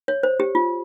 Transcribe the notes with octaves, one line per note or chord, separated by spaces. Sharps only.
C#5
C5
G4
F4